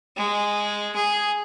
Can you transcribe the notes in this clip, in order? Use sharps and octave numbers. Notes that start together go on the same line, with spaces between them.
G#3
G#4